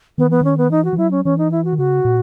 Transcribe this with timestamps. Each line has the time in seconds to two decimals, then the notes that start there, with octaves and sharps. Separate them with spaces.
0.18 D#3 B3
0.30 E3 B3
0.41 D#3 C#4
0.58 B3
0.71 E3 D#4
0.85 F#4
0.93 E3
0.98 F#3 E4
1.11 C#4
1.25 E3 C#4
1.38 D#4
1.52 E4
1.65 F#4
1.72 D#3
1.78 C#3 F#4
2.05 A#2